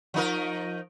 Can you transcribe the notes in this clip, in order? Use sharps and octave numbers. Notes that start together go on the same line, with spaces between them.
F3 D#4 A#4